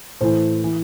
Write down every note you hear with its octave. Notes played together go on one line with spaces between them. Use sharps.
A2 E3 A4 C5
E3